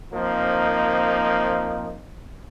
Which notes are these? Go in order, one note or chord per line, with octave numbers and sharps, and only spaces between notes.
F3 A#3 C4 D#4